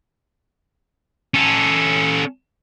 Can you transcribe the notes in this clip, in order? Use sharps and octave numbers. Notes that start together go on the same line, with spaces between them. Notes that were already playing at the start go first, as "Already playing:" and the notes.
C#4 A4